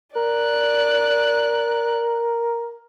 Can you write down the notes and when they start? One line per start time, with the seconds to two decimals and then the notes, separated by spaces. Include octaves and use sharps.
0.16 A#4 D5 F#6